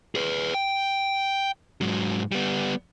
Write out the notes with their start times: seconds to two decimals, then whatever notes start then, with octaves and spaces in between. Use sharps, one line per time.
0.15 G#4 B4
0.54 G5
1.81 G#2 F#3
2.32 G3 B3